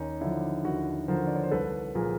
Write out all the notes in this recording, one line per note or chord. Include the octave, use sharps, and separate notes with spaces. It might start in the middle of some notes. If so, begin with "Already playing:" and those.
Already playing: D#2 C#4 D#4
D3 F3 D4 E4
D#2 E4 F#4
D3 F3 A#4 C5
D5
C#5
C5
C2 A4 B4
A#2 F3 G#4 A#4